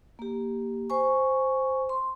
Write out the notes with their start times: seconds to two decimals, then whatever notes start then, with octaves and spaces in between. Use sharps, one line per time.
0.19 A#3 G4
0.90 C5 G#5 C#6
1.89 C6